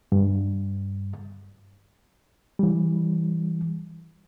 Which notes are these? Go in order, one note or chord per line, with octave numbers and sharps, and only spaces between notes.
G2
E3 G3